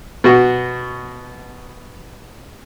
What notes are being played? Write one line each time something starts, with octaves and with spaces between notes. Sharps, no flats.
B2 F#4